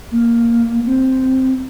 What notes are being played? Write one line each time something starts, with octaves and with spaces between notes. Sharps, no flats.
A#3
C4